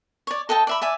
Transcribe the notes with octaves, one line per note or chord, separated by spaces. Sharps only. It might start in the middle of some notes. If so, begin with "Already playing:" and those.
C#5 D5
A4 D#5 G5 A5
D5 E5 B5
D5 E5 G#5